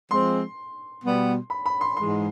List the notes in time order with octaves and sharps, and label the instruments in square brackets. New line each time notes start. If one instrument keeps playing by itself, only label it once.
[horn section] F3 G#3 C4 [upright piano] C6
[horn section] B2 G3 B3
[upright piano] B5
B5
C6
[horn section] G#2 E3 G#3 [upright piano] C6